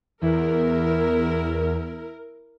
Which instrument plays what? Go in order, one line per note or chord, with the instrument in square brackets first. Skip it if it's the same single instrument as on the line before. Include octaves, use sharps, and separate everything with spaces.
[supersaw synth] E2 [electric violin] E4 [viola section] A#4